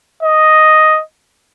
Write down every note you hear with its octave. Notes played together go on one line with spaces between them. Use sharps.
D#5